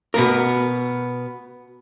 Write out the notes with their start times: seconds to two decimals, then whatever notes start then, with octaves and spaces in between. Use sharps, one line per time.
0.14 B2 B3 A#4